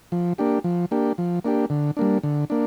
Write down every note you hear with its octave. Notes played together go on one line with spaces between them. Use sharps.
F3
A#3 D4 G4
F3
A#3 D4 G4
F3
A#3 D4 G4
D3
G3 A#3 D4
D3
A#3 D4